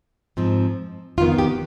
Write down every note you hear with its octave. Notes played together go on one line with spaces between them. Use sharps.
G#2 F3 C4
F2 D#3 B3 F4
G4